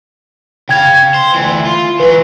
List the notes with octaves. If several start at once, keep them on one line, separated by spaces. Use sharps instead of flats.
C#3 F5 G5 G#6
C5
D2 E3
F4
E3 F#3 B4